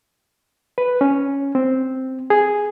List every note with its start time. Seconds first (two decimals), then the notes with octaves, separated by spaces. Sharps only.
0.78 B4
1.01 C#4
1.55 C4
2.30 G#4